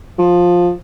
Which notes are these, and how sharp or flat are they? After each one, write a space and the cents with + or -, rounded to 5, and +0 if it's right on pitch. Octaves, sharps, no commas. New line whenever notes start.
F3 +15